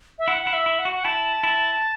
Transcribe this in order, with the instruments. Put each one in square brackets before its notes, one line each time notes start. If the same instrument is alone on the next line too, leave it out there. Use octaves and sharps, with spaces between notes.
[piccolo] E5
[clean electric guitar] E4 [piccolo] F#5
[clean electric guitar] E4 [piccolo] F#5
[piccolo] E5
[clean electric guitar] E4
[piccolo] F#5
[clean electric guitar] F#4
[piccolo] F#5
[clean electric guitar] E4 [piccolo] A5
[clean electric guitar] E4